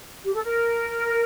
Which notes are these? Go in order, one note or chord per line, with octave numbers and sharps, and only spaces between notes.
G4
A4
A#4